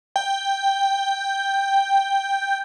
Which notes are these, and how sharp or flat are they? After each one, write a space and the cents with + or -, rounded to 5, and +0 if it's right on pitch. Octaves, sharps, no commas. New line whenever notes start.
G5 +5